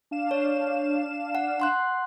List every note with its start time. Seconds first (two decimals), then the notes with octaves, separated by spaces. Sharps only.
0.11 D4 F5 E7
0.31 C#5
1.35 F#5
1.60 F#5 C6 F#6